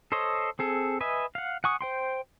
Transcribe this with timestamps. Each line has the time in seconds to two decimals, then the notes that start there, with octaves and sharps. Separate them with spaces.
0.12 A4 C5 C#5 D#5
0.59 C4 G#4 A4
1.01 B4 D#5 E5 G#5
1.35 F5 F#5
1.64 F#5 G#5 C#6 D#6
1.81 C5 G5 C6